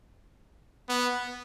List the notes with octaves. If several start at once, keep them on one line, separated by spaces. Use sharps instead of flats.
B3